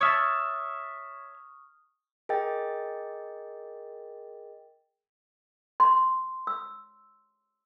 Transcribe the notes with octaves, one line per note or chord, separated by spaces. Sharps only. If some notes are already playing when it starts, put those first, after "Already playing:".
C#5 E5 A5 C#6 D#6 F6
G#4 A#4 D#5 G5 A6
C6
E6